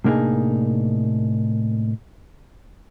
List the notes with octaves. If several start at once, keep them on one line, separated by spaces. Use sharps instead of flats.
A2 C3 A#3 D4 D#4 G#4